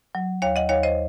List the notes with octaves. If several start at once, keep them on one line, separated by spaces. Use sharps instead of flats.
F#3
D#2 C#5 F5
D#5 F#5
D#2 C#5 F5
C5 D#5